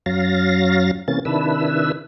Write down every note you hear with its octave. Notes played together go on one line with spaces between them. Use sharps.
F#2 F#3 F5 A6 A#6
C3 E3 A#3 C#4 A6
C3 D#3 D4 E4 B4 E6